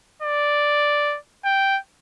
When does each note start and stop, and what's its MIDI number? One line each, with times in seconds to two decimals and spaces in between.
0.22 1.17 74
1.45 1.78 79